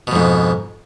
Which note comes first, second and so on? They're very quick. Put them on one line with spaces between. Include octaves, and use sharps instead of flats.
B2 F2 G#2